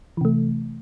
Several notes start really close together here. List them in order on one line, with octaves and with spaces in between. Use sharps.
E3 C3 A3